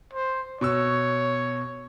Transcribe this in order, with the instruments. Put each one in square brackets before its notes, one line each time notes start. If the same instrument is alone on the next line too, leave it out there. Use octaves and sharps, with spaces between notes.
[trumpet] C5
[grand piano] B2 C#6 E6 [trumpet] C#5